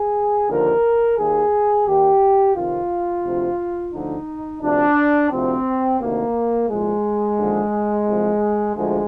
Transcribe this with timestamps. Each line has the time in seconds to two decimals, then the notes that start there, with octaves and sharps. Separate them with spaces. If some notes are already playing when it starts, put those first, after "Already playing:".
Already playing: G#4
0.48 D#2 D3 F3 A#4
1.18 D#2 D#3 G#4
1.86 D#2 D#3 G4
2.54 F2 C3 D#3 F4
3.24 D2 C3 F3
3.93 D2 D3 F3 D#4
4.61 D2 C3 F3 D4
5.30 D2 C3 F3 C4
6.00 D2 C3 D#3 A#3
6.68 C2 A#2 F3 G#3
7.38 D#2 D3 F3
8.06 C2 C3 F3
8.75 D2 D3 F3 G#3